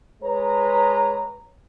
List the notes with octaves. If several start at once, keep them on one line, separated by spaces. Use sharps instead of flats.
G#3 B4 C#5 A#5